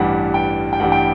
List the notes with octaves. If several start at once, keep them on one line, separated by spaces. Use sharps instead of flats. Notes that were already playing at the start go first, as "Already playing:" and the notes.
Already playing: A1 G2 E3 G3 F#5
G5
G5
A1 G2 E3 G3 F#5
G5